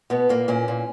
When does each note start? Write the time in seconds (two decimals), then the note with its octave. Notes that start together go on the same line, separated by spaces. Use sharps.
0.10 B2 B3
0.29 A#2 A#3
0.48 A#2 C#4
0.68 A#2